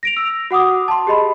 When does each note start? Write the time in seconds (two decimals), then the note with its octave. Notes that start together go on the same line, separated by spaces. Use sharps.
0.03 A#6 D7 F7
0.17 E6
0.51 F#4 F#5 D6 D#6
0.88 A5 C6
1.07 G4 G#4 D#5 B5